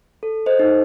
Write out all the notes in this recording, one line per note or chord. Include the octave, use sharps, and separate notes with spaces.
A4
C5 D#5
D#4